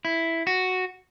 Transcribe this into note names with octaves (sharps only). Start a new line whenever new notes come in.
E4
F#4